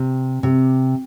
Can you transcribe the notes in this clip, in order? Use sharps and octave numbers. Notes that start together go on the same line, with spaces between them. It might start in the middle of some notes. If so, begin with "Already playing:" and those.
Already playing: C3
C3